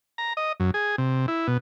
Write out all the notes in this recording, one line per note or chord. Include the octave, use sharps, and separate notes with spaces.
A#5
D#5
F#2
G#4
C3
E4
B2